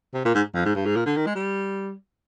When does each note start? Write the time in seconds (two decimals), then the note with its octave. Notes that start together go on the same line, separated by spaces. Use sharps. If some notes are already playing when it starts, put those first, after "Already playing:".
0.14 C3
0.25 A#2
0.34 G#2
0.55 F2
0.66 G#2
0.75 G2
0.86 G#2
0.96 A#2
1.06 D3
1.16 D#3
1.26 G#3
1.35 G3